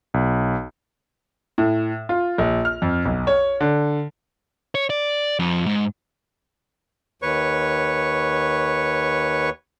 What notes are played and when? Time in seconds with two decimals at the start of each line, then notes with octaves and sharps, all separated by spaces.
0.14 B1
1.58 A2
2.09 F4
2.38 A#1
2.65 F6
2.82 F2
3.05 B1
3.27 C#5
3.60 D3
4.75 C#5
4.90 D5
5.39 F2
5.66 G#2
7.22 D#2 B4 C#5 C#6